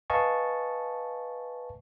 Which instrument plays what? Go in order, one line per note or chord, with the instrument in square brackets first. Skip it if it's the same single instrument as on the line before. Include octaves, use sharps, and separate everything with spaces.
[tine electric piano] B4 D#5 F5 G#5 A5 C#6